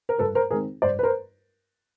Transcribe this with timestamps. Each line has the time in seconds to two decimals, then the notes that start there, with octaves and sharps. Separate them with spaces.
0.09 A#4
0.19 G2 A4 B4
0.35 A#4 C5
0.51 D#3 G#3 C4 G#4 A#4
0.82 G2 C5 D5
0.99 B4
1.03 A#4 C5